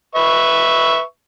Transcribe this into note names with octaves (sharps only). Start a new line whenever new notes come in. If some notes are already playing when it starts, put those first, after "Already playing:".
B4 E5 C#6